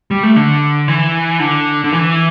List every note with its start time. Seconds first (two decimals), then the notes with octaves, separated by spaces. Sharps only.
0.11 G3
0.23 A3
0.36 D3
0.88 E3
1.40 D3
1.84 D3
1.92 E3